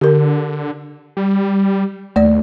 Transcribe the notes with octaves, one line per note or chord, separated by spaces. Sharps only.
D3 G4 A#4
G3
D#2 A3 D5